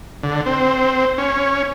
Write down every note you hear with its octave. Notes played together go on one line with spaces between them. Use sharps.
D3
C4
C#4